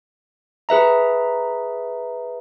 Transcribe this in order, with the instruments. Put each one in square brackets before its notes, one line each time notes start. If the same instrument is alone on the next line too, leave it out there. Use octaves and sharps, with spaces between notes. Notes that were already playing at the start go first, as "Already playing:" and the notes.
[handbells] G#4 B4 E5 A#5